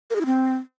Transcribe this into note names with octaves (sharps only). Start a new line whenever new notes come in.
A#4
G#4
E4
C4